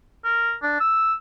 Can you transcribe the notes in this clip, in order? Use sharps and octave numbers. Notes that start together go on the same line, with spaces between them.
A#4
D4
E6